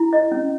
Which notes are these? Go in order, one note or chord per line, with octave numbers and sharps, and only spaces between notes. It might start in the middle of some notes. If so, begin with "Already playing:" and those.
Already playing: E4
D#5
C#4